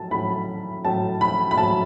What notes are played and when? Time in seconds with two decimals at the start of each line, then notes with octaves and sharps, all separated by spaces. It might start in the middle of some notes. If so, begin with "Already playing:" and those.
Already playing: A2 F#3 A5
0.11 A2 F#3 B5
0.85 A2 F#3 A5
1.21 B5
1.51 B5
1.57 A2 F#3 A5